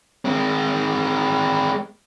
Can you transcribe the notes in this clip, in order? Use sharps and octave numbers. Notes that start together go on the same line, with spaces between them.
G#3 C4